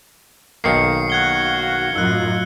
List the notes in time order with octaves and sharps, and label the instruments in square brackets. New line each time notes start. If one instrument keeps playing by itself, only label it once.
[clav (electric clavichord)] B1 D#3 A#3 [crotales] C7 C#7
[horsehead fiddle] F#4 F5 [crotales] F#6 G#6 G7
[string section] F#2 A2 [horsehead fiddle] D#4 F4 [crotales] E6 F#6